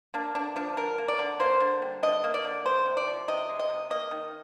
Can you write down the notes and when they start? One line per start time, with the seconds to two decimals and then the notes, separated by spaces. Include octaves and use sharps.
0.14 A#3 D4
0.35 D3 D4
0.56 F3 D4
0.77 D3 A#4
0.98 A#3
1.08 D5
1.19 D3
1.40 A#3 C5
1.60 D3
1.82 G3
2.03 D3 D#5
2.24 A#3
2.34 D5
2.44 D3
2.66 G#3 C5
2.86 C3
2.97 D5
3.07 F3
3.28 C3 D#5
3.49 G#3
3.59 D#5
3.70 C3
3.90 A#3 D#5
4.11 D#3